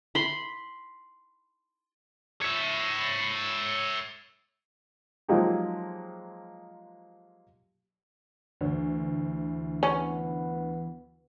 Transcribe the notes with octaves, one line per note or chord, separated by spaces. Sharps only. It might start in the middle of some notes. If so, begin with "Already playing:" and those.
B5 C6
C#5 E5
F3 F#3 G#3 A#3 D#4 G4
D2 E3
B3 C#4